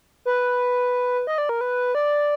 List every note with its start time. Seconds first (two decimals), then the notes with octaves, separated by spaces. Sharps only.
0.26 B4
1.27 D#5
1.38 D5
1.49 A#4
1.61 B4
1.95 D5